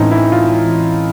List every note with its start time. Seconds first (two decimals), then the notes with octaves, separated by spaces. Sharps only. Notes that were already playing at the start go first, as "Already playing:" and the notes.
Already playing: A2 E3 G#3 C4 C#4 D#4
0.12 E4
0.32 F4